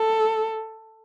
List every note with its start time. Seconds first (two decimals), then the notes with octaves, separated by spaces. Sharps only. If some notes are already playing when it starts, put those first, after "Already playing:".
Already playing: A4